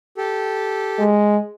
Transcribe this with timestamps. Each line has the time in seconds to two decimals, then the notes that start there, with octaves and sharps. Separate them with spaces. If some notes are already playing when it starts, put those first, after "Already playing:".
0.17 G4 A4
0.99 G#3